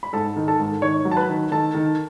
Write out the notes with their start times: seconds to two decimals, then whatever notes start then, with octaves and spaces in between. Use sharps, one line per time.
0.03 B5
0.13 G#2 A4 A5
0.36 D#3
0.48 A4 A5
0.59 G#2
0.82 D#3 C#5 C#6
1.05 F#3
1.11 A5
1.17 B4 B5
1.29 D#3
1.51 D#3 A4 A5
1.74 D#3